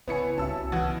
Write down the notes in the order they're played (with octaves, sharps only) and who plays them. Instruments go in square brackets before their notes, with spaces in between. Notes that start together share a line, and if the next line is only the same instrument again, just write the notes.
[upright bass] C#3 [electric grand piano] B3 E4 C#7 [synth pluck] B4 C#5 G#5
[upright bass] C2 [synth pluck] C#4 F#4 E5 [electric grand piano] A5 E6
[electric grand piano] B2 F#5 [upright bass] D#3 [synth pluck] E3 G#6